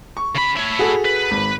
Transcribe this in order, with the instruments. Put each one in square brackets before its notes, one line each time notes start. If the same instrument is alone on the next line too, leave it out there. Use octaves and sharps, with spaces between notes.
[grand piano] C#6
[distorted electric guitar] C#3 B5
E4 C#5
[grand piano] F#4 G#4 A4
[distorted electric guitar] B4
[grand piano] G#1